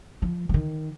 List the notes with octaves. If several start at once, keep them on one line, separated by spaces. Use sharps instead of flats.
F3
F3
D#3